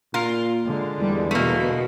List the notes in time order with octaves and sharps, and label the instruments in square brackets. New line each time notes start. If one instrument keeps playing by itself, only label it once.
[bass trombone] A#2 [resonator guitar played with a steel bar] F4 A#4
[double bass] D3 G#3
[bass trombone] E2 [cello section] G3
[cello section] B2 [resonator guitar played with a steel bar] A3 A#3